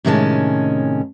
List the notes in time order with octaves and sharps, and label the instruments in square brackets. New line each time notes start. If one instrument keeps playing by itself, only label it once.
[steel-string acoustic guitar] A2 C3 D#3 G#3 C#4 A5